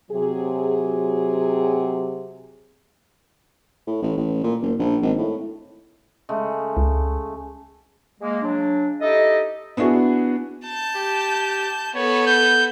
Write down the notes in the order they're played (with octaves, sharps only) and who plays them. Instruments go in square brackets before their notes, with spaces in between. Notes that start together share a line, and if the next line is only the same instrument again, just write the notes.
[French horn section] C3 F#3 G#4
[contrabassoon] A2
A1
A1
A#2
F#1
A#1
G#1
A2
[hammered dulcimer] C#3 G#3 A3
[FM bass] C#2
[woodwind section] G#3 A#3
C#3 F#3 D4
D#4 E4 G4 A4 D#5
[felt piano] B3 D4 E4 F#4 G#4
[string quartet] A5 G6
[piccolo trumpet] G4
[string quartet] B3 A4 [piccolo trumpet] C#5
[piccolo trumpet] G6